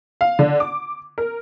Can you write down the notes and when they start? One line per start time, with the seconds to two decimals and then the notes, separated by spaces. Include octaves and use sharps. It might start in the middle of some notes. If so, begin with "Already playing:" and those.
0.21 F5
0.39 D3
0.60 D6
1.18 A#4